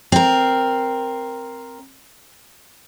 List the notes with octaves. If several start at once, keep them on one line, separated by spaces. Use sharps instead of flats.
C4 A#4